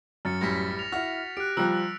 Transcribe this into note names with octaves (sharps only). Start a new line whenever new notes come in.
F#2 F6 A6 C#7
A1 G3 A#6 B6
F7
E4 F#4 F6
G4 F#6 D7
F3 G3 A#5 E6 F#6